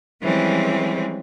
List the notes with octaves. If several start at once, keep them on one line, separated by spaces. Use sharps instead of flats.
E3 F3 G3 G#3 C4 C#4